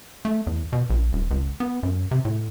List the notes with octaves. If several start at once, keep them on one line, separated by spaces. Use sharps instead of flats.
A3
E2
B2
A#1
D#1
C#2
B3
F#2
C3
A2